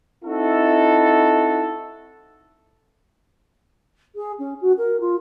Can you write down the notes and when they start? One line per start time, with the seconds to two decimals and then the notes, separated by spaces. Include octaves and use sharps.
0.25 C4 D#4 E4 F#4 A4
4.15 G#4
4.39 C#4
4.61 F#4
4.78 A#4
5.00 F4